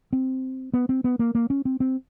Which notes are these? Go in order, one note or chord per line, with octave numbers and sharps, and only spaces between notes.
C4
B3
C4
B3
A#3
A#3
C#4
C4
C4